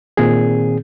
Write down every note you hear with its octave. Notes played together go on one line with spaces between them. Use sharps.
A#2 D#3 C4 G#4